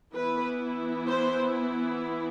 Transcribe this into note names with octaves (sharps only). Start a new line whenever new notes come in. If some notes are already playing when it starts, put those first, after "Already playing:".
E3 B3 E4 B4
C5